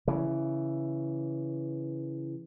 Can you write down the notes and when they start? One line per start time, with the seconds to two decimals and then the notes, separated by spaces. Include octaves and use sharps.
0.08 C#3 E3